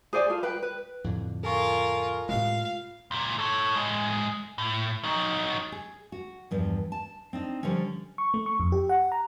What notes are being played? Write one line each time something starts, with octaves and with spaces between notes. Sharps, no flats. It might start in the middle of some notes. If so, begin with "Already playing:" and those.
G#4 C5 D5 G#5
F4 A4
B4 G5
B4
F2 A2 D3
F4 A4 A#4 G#5 C#6
A2 C3 G#3 F4 F5
C#2 A#2
A4 C#5
A2 G#3
A2
F#3 D#4
G#4
F#4
E2 G2 F3
A5
C4 D4 D#4
D3 F3 G3 C#4
C#6
A3
C#6
F2
G4
F#5
A#5